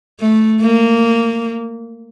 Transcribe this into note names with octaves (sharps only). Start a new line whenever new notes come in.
A3
A#3